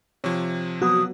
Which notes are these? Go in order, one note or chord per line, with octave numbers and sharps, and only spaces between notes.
C3 F3 C#5
F#3 B3 F#4 D#6